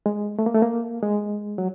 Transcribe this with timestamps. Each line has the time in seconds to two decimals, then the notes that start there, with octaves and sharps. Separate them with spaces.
0.06 G#3
0.39 A3
0.46 A#3
0.54 A3
0.62 A#3
1.03 G#3
1.58 F#3